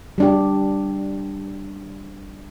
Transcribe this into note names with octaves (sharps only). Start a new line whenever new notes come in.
G3 D4 G4